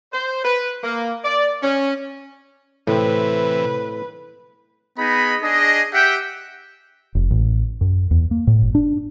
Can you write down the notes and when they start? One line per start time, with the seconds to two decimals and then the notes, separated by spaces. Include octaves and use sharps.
0.13 C5
0.44 B4
0.84 A#3
1.24 D5
1.63 C#4
2.87 A2 C3 E3 C4 B4
4.98 B3 D#4 G#4 D#5 B5
5.42 D4 G#4 D#5
5.93 G4 E5 F#5 G5
7.15 F1
7.31 A1
7.81 F#2
8.11 E2
8.31 A#3
8.47 A2
8.62 G1
8.75 D4